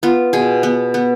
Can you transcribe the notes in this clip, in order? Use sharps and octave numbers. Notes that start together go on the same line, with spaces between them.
B3 F4
B2 G#4
B3
B3